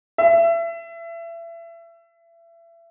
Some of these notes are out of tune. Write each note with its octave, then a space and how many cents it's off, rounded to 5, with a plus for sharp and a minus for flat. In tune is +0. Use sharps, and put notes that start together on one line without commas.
E5 +30